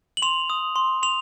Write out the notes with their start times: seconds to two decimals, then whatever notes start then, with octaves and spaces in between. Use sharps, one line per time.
0.17 F#7
0.22 C6 F7
0.50 D#6
0.76 C6
1.03 C6 F7